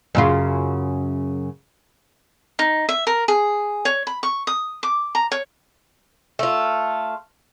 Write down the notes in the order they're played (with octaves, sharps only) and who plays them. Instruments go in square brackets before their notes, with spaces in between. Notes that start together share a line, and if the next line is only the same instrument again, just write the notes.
[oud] F#2 C#3 F4
[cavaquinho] D#4
E5
A#4
G#4
C#5
B5
C#6
D#6
D6
A#5
C#5
[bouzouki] A3 F4